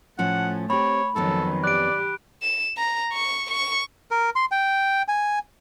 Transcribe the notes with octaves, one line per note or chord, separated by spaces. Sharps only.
A2 F3 A3 C#4 F#5
C4 G4 C#5 B5
F2 D#3 F#3 B3 C#4 A4
G4 D5 F#6 D7
E7
A#5
C#6
C#6
A#4
C6
G5
G#5